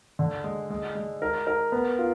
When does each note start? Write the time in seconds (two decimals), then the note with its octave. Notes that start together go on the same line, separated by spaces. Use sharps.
0.19 D3
0.44 G#3
0.70 G#3
0.95 G#3
1.22 A#4
1.47 A#4
1.72 B3
1.98 F4